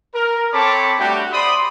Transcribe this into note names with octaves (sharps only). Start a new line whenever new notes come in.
A#4
C4 A4 C#5 A5 B5 D6
G3 A3 D4 F#4 G4
C5 D5 B5 C6 D#6